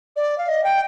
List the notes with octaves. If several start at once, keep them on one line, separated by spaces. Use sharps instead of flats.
D5
F5
D#5
G5